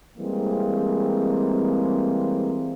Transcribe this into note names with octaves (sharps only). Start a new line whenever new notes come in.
E3 G3 G#3 A#3 C4